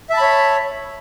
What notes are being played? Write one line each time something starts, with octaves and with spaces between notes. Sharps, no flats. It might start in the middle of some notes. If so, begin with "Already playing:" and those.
C#5 E5 A5 B5